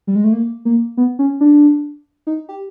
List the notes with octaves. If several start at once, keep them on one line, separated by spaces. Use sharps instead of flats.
G3
G#3
A3
A#3
A#3
B3
C#4
D4
D#4
G4